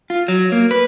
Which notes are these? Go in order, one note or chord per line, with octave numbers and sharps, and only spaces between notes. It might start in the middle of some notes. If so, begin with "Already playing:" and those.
F4
F#3
A#3
B4